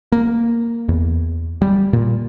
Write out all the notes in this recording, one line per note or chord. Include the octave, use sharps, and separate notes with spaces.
A#3
E2
G3
A#2